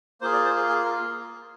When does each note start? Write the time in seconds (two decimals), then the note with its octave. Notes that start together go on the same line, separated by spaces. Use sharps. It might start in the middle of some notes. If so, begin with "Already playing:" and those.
0.21 A#3 F4 G#4 C5
0.33 D5
0.45 C5
0.57 G#4
0.69 G#4
0.85 A#4